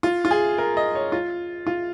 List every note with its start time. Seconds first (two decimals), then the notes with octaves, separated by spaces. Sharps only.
0.03 F4
0.25 F4
0.31 G#4
0.58 A#4
0.77 D#5
0.95 C#5
1.12 F4
1.67 F4